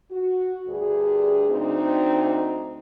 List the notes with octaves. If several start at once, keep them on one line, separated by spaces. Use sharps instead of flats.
F#4
D2 G2 G#4
D2 C4 D#4